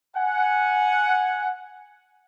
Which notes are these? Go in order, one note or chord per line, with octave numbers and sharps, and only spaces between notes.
F#5 G#5